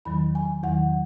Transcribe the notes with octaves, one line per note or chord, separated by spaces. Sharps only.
E2 D#3 F#3 B5
G#5
E2 D#3 F#3 F#5